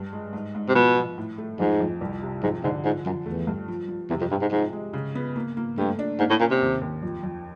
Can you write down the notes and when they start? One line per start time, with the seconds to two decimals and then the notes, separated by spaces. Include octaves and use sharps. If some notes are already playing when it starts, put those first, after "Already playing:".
Already playing: G2
0.13 G#3
0.33 G#2
0.55 G#2
0.69 C3
0.75 B2 F3
0.96 F3
1.18 A2
1.38 A3
1.59 F2 G#2
1.80 F2
2.01 C2
2.22 C3
2.43 F2 G#2
2.63 G#2 D3
2.84 G#2 F3
3.06 F#2 F3
3.26 E2 A3
3.47 G2
3.68 F3
3.89 F3
4.10 E2 C3
4.21 F2
4.31 G2 C3
4.41 G#2
4.52 G#2 F3
4.73 G#3
4.93 C#3
5.15 B3
5.36 A#3
5.57 A#3
5.78 G2 A3
5.99 D4
6.19 G#2 A#3
6.30 A2
6.40 A#2 C#4
6.51 C3
6.61 D#2
6.81 D#2
7.02 F2
7.23 F2